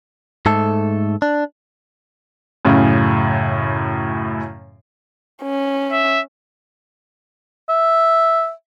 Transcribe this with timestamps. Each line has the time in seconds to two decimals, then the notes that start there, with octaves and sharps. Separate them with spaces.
0.46 G#2 A3 A4
1.22 D4
2.65 F#2 A2 C#3
5.42 C#4
5.92 E5
7.69 E5